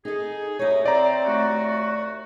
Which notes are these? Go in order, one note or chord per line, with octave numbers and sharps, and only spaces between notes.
D#4 G#4 A4
C2 C3 D#4 E4 C#5
C4 D5 A#5
D#2 A3 F#4